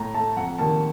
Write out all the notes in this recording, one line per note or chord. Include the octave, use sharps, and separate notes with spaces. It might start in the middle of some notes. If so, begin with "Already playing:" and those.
Already playing: A2 A#5
A3 A5
F2 F#5
C3 D#3 A#3 A5